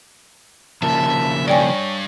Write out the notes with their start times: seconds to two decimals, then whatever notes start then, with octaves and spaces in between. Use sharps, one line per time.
0.82 C#3 F3 A#3 E5 A5
1.48 G2 C#5 D5 G5 G#5